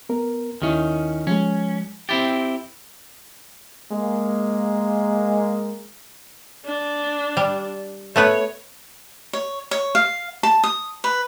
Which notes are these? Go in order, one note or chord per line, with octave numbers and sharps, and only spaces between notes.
B3 A#4
D#2 D#3 C#4 E4
F3 G#3 C#4
C4 E4 G4 A6
G#3 A#3
D4
G3
A3 B3 B4 C#5
C#5
C#5
F5
A5
D#6
B4